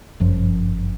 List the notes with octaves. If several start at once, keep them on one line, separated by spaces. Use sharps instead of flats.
G1 F#2 F3